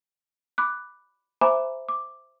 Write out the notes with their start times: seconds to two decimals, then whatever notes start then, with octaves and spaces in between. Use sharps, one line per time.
0.58 B5 D6 F#6
1.41 C5 E5 G#5 A#5 B5 D6
1.89 D6